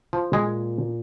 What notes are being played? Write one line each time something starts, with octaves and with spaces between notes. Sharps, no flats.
F3
A#2 G#3